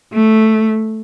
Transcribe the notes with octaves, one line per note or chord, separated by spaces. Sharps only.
A3